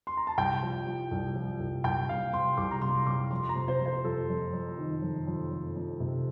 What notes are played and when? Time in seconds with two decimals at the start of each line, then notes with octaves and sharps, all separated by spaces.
0.07 C6
0.17 A#5
0.27 A5
0.38 C2 G5
0.63 F3
0.87 F3
1.11 C2
1.35 F3
1.60 C2
1.84 C2 G5
2.09 C2 F5
2.33 C3 C6
2.57 C2 D6
2.71 A#5
2.82 C2 C6
3.07 C2 D6
3.31 F2 C6
3.49 A#5
3.55 C3
3.68 C5
3.80 F2
3.86 C5
4.04 F2 A4
4.29 F2
4.53 F2
4.78 D#3
5.02 F2
5.27 F2
5.51 F2
5.76 F2
6.00 C3